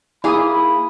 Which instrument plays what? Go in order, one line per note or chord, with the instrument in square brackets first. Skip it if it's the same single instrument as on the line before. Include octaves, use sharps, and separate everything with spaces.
[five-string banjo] A#3 G#4 [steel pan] E4 D#6 [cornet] B5